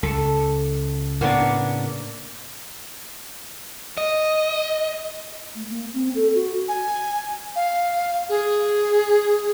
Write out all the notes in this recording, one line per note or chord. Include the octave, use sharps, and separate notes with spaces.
C#2 A4
A2 C#3 A#3 B3 D4
D#5
A3
A#3
C4
A4
F#4
G#5
F5
G#4